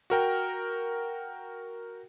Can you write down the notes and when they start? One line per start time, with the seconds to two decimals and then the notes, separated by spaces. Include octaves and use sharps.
0.10 F#4 A#4 G5